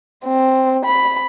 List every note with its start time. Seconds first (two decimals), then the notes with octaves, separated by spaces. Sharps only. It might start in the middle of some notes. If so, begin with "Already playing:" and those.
0.25 C4
0.85 B5